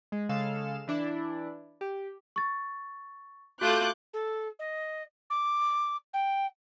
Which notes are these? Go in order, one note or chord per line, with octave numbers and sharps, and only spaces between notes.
G#3
C#3 G#3 A4 F5 E7
E3 D4 E4
G4
C#6 A6
A3 F4 F#4 D6 F#6 G6
A4
D#5
D6
G5